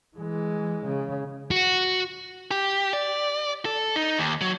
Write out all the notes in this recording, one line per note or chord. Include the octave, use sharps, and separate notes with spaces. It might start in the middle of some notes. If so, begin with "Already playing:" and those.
E3 G#3
C#3
F#4
G4
D5
A4
D#4
D#2
F#3